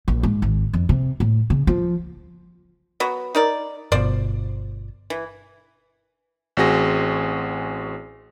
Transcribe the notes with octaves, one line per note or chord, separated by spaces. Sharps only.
A#1
G#2
G#1
F2
C3
A2
C#3
F3
F#3 B3 F#4
D#4 A#4 D5
G1 B2 F3 C5 D5
E3
A1 C4 F#4 G#4 A#6